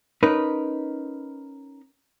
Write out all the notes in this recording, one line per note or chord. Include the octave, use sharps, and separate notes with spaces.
C#4 D#4 A#4 B4